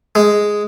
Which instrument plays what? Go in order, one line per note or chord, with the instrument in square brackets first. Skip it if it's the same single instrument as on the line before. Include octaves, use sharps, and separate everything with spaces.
[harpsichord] G#3